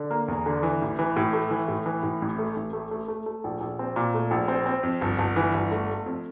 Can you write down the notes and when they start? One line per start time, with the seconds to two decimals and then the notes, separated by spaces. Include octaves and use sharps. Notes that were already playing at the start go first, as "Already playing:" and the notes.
Already playing: D3
0.11 A#3
0.28 E2
0.46 D3
0.63 E3
0.82 A1
0.99 E3
1.16 A2
1.33 A3
1.51 E3
1.68 A2
1.86 E3
2.03 A2
2.22 A1
2.39 A3
2.56 A1
2.73 A3
2.91 A3
3.08 A3
3.26 A3
3.44 A#1
3.61 A#1
3.79 C4
3.96 A#2
4.14 A3
4.31 A#1
4.48 C4
4.66 C4
4.83 F2
5.01 G1
5.18 G1
5.36 E3
5.54 G1
5.72 A3
5.89 A3
6.06 F2